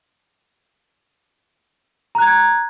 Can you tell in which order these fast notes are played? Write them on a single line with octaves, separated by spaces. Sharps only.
A#5 F#6 G#6